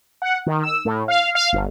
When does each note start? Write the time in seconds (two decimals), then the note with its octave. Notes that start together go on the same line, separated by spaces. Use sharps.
0.22 F#5
0.47 D#3
0.63 E6
0.85 A2
1.08 F5
1.35 F5
1.53 G1